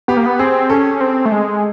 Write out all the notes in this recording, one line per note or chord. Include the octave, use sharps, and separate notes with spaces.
B3 G4
A#3
B3
C4 G#4
C#4 A4
C4
A3
G#3